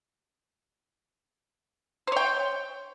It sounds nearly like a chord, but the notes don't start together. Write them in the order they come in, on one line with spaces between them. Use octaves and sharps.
C5 C#5 G5